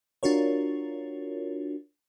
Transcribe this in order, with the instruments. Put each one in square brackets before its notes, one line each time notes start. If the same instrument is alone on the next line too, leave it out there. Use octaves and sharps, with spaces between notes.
[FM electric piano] D4 F4 F#4 A#4 C#5